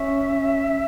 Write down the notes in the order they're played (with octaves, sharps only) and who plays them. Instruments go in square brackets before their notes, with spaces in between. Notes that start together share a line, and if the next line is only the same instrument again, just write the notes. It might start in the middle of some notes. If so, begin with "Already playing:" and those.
Already playing: [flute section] C#4 E5
C#4